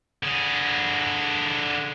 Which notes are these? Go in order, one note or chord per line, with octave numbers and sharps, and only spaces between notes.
D3 G#4